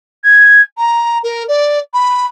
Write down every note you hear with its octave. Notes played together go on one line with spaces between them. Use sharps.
G#6
A#5
A#4
D5
B5